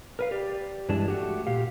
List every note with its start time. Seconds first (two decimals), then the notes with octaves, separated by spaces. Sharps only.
0.19 A#4 B4 F5
0.31 G4 D5
0.89 G2 E3 G#3 D4 A5
1.08 A3 F#4 G4
1.47 A#2 G4 F5